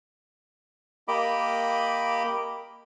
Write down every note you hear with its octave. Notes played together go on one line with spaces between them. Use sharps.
A#3 G4 D#5 B5 D6